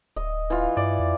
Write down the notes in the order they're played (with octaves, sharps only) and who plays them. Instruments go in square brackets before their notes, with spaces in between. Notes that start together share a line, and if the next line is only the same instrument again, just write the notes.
[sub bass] D1 [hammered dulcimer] D#5
[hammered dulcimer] E3 F4
[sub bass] G2 [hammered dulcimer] D5
[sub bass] F2